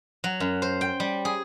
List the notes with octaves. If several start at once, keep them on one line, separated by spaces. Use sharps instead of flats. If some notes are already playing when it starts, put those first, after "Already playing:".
F#3
F#2
C5
G5
G3
G#4